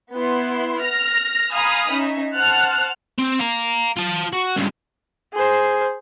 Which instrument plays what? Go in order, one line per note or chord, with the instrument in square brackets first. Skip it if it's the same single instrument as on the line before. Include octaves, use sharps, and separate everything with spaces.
[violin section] B3 E4 C6
F6 A#6
F5 G#5 A#5 B5 D#6 F6
C#4 D#4 E5
C5 F#5 A5 F6 F#6
[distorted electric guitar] C4
F5 A#5
F4 A5
F#4
C#2 G2
[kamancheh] G#4 C5